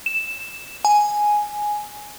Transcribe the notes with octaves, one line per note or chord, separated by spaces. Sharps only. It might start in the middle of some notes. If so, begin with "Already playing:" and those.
E7
G#5